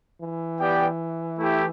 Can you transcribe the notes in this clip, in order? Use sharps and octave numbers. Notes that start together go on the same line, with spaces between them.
E3
B3 G4 D5 G5
A3 E4 G4